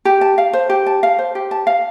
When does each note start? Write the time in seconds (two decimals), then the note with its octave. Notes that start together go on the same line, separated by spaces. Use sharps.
0.05 G4
0.21 A5
0.38 F5
0.53 C5
0.70 G4
0.86 A5
1.03 F5
1.19 C5
1.35 G4
1.51 A5
1.67 F5